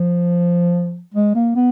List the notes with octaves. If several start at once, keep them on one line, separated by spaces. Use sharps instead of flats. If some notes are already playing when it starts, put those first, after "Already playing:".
Already playing: F3
G#3
A#3
B3